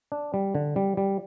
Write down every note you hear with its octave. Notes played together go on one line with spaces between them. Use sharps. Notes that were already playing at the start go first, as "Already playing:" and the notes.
D4
G3
D3
G3
G3